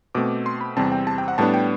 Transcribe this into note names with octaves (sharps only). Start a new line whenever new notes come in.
B2 A3 C4 D6
C6
B5
E2 C3 G3 C4 A5
G5
A5
G5
F#5
A2 G3 B3 D4 A5
G5